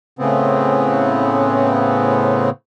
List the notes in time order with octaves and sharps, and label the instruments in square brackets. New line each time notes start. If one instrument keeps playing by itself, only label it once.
[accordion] A2 C#3 B3 C4